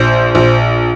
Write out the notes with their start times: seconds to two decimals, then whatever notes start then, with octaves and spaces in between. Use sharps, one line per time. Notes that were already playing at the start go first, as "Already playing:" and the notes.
Already playing: A#1 C5
0.35 A#1